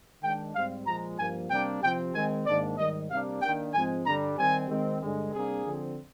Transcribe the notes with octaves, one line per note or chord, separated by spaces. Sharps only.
D#3 G#3 D4 G5
G#2 G3 C4 F5
A#2 F3 G#3 A#5
G2 F3 A#3 G#5
C3 G3 A#3 D4 G5
C3 F3 C4 G5
D#3 G#3 C4 G#5
G#2 D#3 A#3 D4 D5
G#2 D#3 G3 D#5
C3 G3 A#3 D4 F5
D#3 A#3 D4 G5
G#2 F3 G#3 C4 G#5
G2 D3 G3 D4 A#5
D#3 G3 C4 G#5
D#3 G#3 C4
G2 D3 G#3
C3 G3 A#3 D4 G#4
D3 F3 C4